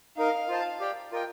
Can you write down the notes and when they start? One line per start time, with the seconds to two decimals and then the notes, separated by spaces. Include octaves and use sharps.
0.17 D#4 A#4 D#5 F5
0.49 F4 C5 D#5 A5
0.80 G4 D5 G5
1.11 F4 A#4 D#5 G5